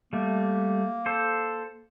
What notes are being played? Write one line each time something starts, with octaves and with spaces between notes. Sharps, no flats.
G3 A3 A#3
A4 C5